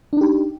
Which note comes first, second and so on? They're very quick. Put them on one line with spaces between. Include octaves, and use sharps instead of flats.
D4 D#4 G4